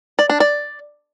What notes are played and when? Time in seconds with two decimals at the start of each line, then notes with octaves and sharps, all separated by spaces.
0.19 D5
0.30 D4
0.40 D5